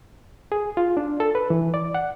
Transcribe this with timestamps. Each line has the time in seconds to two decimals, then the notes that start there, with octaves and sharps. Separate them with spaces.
0.52 G#4
0.77 F4
0.97 D4
1.20 A4
1.35 B4
1.50 E3
1.74 D5
1.94 F#5